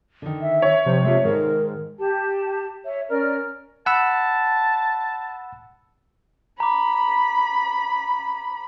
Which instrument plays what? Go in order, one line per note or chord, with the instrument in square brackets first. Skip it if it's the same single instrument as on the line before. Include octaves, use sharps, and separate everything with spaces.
[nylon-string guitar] D3 D#3
[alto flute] E5
[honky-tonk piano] C#5
[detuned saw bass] C3 [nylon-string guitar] F3 G5 [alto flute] C5
[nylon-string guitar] G#3 A3 F4 [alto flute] E5
[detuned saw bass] G#2 [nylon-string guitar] D#3 A4 C5 [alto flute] A#4
[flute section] G4 A5
C#5 E5
C#4 A#4 D5 F6
[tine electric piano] F#5 B5 E6 [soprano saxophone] A5
[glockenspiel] A#5 D6 [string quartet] B5